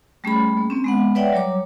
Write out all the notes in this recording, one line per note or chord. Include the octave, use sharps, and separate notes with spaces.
G3 A3 C#4 G#4 B5
A#3
A#3 C4 C#4
G#3 B3 F#5
B4 C#5 D5 E5 F#5 G5
F#3 G3 C#5 A#5 D6